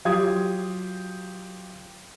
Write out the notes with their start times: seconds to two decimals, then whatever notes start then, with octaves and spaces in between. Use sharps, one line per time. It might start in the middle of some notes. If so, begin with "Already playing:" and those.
0.05 F#3 F4 G4 D#6 G#6